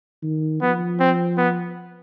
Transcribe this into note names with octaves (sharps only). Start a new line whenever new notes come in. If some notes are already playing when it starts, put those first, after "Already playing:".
D#3
F3 B3
C4
B3